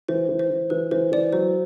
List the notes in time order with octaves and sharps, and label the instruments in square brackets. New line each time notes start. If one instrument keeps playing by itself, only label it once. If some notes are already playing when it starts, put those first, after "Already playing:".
[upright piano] E3 [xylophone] C5
[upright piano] E3
[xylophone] C5
[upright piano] E3
[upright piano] E3 [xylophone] B4
[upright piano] E3 [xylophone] C5
[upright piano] E3 [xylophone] D5
[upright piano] F#3 [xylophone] C5